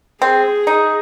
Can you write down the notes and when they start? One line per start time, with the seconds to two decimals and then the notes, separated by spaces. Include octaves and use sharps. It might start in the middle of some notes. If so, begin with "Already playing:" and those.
0.22 C4 G#4
0.67 D#4